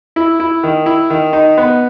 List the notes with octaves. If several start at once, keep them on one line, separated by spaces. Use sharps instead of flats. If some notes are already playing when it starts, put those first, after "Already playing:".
E4
E4
D#3
E4
D#3
D#4
B3